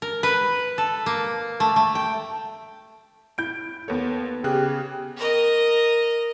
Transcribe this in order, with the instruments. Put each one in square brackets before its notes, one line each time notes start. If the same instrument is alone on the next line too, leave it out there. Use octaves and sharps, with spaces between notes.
[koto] A#4
B4
A4
A#3
A3
A3
G5
[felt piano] E4 G6 [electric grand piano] D7
[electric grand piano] D#2 C#5 [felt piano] B3 A4
[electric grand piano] C#3 G#4 F#6 [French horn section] G4
[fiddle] A#4 D#5